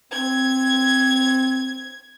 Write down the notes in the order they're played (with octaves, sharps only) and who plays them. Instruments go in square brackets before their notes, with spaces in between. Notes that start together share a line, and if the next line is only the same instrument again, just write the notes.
[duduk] C4 [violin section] G#6